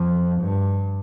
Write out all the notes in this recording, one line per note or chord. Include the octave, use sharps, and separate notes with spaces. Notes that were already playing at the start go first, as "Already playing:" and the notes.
Already playing: F2
G2